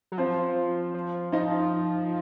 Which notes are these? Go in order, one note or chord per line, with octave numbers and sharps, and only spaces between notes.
F#3
F3 C4 C5
F3
F3 D#4 D#5